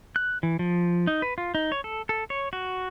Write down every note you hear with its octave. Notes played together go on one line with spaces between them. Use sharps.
F#6
E3
F3
D#4
B4
F4
D#4
C#5
A4
A4
C#5
F#4